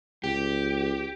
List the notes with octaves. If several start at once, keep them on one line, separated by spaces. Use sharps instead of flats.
C#2 G4